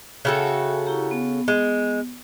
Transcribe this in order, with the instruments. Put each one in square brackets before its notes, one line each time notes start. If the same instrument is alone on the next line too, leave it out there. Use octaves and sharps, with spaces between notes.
[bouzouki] C#3 F#4 A4 [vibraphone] E5 G5 A5
[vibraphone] E4 G4 A#5
B3
[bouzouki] G#3